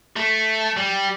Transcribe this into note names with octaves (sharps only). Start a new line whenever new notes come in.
A3
G3